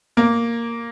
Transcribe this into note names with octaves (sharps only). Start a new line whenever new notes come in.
A#3 A#4